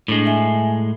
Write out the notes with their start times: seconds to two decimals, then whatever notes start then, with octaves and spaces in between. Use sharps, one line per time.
0.08 A2 G#3 D4
0.26 E5 G#5